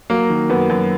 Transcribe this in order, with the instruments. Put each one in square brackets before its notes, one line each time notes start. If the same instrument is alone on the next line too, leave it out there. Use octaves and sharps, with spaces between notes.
[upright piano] F#3 [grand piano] A#3
[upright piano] D#3
[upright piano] F#2 [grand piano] B3
[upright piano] F#2